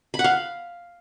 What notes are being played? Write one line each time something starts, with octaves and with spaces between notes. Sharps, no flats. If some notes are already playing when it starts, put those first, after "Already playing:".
B5
F#5
F5